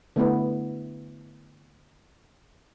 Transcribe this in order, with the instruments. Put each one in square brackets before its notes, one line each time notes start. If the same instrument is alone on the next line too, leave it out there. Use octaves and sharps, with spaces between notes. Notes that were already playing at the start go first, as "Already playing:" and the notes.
[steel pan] D3 A3 B3 E4